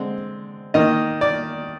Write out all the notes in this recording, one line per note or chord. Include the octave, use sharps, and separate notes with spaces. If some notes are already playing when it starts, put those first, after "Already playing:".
Already playing: D3 G#3 C4
D#3 A#3 D#5
D5